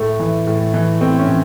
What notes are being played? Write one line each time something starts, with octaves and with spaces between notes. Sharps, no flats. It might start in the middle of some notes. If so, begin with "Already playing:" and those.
Already playing: A2 A3
E3
A2
E3
A2 C4
C#4
E3